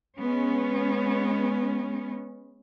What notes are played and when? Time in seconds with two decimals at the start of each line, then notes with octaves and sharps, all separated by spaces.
0.18 G#3 B3 C#4